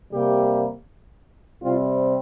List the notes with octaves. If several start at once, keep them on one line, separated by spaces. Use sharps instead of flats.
C3 G3 A#3 G4
C3 G3 C4 F4